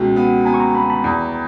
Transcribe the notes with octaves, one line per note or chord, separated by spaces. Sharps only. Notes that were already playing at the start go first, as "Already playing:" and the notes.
Already playing: C#2 B2 G5
B3
B3 G#5 A#5
C#6
A#5 C6
B3 A5 B5
A5 B5
E2